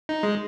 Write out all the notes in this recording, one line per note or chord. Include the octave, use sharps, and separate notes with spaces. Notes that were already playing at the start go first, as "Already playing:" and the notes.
D#4
G#3